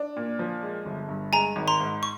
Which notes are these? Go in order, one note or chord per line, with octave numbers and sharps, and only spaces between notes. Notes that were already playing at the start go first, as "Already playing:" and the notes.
Already playing: D4
A#2
F3
G#3
G1
G2
G#3 G#5 A#5
G#1
A#5 C6
G#2
C#6